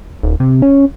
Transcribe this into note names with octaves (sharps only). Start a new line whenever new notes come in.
D#1
C3
C#4